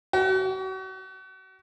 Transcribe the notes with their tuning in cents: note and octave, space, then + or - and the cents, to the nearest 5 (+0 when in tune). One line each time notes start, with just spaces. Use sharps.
F#4 +35